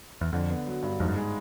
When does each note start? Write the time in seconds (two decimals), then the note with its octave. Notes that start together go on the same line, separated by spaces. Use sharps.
0.21 E2
0.33 F2 D3
0.50 B3
0.67 F#3
0.83 G2
1.00 F2 G#2
1.08 F#2
1.16 G#3